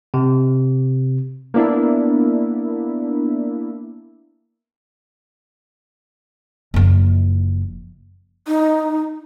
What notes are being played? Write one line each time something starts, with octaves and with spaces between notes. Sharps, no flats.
C3
A#3 B3 D4 E4
F#1 F3
D#4